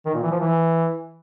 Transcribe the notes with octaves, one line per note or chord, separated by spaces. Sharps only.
D#3
A#2
E3
F3
E3